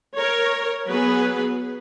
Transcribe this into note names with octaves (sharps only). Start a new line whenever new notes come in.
A#4 C#5
F#3 B3 G#4 B4